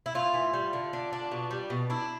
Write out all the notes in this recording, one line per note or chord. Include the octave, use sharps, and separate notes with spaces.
E4
A2 F4
E3
G3
D3
D4
D4
B2
G3
B2
D4 E4